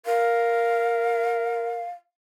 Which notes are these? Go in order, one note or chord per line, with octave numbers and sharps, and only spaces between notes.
A#4 F5